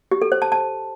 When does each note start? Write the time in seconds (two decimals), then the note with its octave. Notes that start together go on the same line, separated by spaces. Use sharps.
0.11 G4
0.22 A4
0.32 C5
0.42 A5
0.52 A5